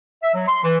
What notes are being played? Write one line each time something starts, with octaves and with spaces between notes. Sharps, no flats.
E5
F#3
C6
E3